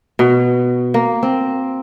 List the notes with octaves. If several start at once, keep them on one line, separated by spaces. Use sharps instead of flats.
B2
A#3
C4